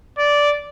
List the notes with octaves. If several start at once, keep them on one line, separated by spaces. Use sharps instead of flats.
D5